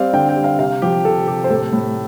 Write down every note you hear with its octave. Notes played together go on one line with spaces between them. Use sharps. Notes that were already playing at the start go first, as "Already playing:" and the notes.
Already playing: G3 C4 D5 F5
D3 G5
G5
G3
F5
C3 F5
F3 G4
C3 A4
C3 G4
C5
A2 A4
A2